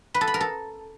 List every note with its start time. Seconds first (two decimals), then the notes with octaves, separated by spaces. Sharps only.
0.14 B4
0.21 A4
0.28 B5
0.34 A#4
0.41 A4